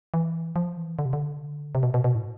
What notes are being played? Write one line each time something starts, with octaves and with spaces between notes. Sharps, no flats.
E3
F3
E3
D3
C3
D3
C3
B2
B2
B2
A2